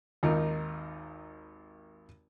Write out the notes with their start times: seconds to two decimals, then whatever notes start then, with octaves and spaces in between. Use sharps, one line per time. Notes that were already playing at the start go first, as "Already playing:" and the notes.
0.23 G#1 D#2 D#4 F4 A#4